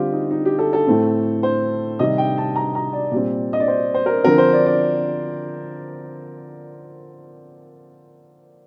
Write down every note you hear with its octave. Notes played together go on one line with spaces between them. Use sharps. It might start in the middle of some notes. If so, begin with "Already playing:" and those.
Already playing: D3 G3 C4 F4 G4
D#4
D#4
G4
A4
A4
A2 A3 C4
C5
C3 D#3 G3 D#5
G5
A5
A#5
A#5
D5
A#2 G3 C4
D#5
D5
C5
C5
A#4
D3 F3 C4 A#4
C5
D5
D5